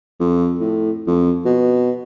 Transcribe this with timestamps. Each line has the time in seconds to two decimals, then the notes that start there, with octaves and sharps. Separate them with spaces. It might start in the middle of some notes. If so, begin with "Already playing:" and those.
0.20 F2
0.60 A2
1.07 F2
1.45 B2